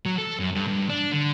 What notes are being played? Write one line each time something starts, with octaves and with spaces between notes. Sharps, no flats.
F#3
A4
F#2
G2
G2
D4
D3